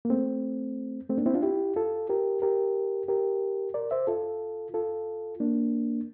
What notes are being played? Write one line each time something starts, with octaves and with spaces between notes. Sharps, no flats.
A#3
A3 C4
A3 C4
A#3 D4
C4 E4
D4 F4
E4 G4
F4 A4
G4 A#4
G4 A#4
G4 A#4
A#4 D5
C5 E5
F4 A4
F4 A4
A#3 D4